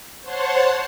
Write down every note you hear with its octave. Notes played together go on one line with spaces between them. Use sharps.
C5 C#5 F#5 A5 C6